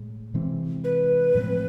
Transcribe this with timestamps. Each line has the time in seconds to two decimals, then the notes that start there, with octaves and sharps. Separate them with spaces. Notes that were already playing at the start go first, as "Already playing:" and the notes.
Already playing: A2 G#3
0.34 C3 E3 G#3 C4
0.84 B4
1.35 A2 F3 G#3 C4